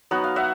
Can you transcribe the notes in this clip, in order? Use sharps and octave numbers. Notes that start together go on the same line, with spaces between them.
F#3 B3 D#4 F#5
F5
E5 F#5